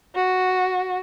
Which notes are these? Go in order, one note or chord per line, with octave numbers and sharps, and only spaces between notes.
F#4